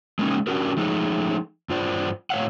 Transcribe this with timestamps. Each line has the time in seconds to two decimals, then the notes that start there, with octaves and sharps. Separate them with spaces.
0.19 G#3 A#3 C4 C#4 D#4
0.47 C#4 D4 F#4 G4 A#4
0.77 F3 G#3 A3 D#4
1.69 G2 F4 C5 D5
2.30 A2 C#5 F5 F#5